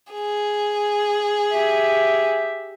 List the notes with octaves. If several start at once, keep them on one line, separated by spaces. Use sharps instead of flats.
G#4
G4 E5